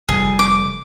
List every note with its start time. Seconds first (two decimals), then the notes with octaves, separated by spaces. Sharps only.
0.09 F1 G3 G#4
0.39 D6